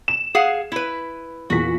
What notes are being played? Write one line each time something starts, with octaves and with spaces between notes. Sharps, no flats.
E7
G#4 F5 F#5
E4 B4
E2 A#2 F#4 B6